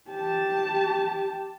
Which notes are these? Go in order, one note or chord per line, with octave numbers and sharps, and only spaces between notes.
G4 A5